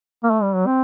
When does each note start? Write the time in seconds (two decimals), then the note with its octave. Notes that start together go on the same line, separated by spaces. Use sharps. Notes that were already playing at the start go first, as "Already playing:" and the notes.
0.23 A#3
0.31 A3
0.42 G3
0.55 F#3
0.66 C4